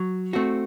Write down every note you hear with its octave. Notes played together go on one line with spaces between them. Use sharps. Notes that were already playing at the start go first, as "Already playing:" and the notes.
Already playing: F#3
A3 C4 F#4